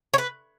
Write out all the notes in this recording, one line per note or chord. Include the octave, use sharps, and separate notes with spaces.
C#5
B4